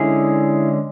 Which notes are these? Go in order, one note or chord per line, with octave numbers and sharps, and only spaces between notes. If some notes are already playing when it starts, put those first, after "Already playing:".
Already playing: D3 G#3 C#4 E4 G#4